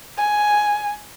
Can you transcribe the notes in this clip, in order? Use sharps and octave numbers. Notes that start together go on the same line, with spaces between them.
G#5